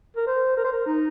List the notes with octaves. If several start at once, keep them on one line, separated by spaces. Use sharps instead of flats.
A#4
C5
A#4
C5
A#4
D#4